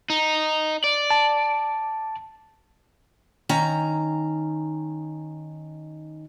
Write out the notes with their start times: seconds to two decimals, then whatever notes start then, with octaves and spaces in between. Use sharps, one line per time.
0.10 D#4
0.84 D5
1.11 A5
3.49 D#3 C#4 A#5